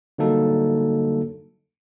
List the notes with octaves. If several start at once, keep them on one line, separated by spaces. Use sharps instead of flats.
D3 F#3 G3 A#3 D#4 A4